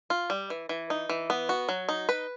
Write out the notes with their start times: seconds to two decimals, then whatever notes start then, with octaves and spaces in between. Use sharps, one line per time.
0.10 F4
0.30 G3
0.50 E3
0.69 E3
0.90 D#4
1.09 E3
1.30 B3
1.49 F#4
1.69 F#3
1.89 D#4
2.09 B4